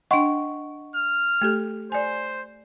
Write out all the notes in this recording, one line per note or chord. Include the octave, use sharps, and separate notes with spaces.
D4 D#5 F#5 G5 C6 C#6
F6
A3 G4 A4
C5 D5 G#5